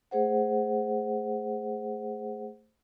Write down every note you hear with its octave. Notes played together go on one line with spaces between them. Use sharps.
A3 G#4 C5 F#5